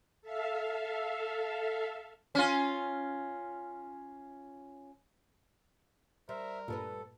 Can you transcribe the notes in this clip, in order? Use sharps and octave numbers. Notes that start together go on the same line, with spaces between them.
A4 E5 F5
C#4 F4
G3 A#4 C5 E5
G2 A#2 G3 B3 A4 B4